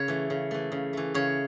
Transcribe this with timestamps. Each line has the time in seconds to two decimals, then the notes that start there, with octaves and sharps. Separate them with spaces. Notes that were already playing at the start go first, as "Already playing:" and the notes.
Already playing: C#3 C#5
0.08 E3 A3
0.30 C#3
0.51 E3 A3
0.72 C#3
0.93 E3 A3
1.14 C#3 C#5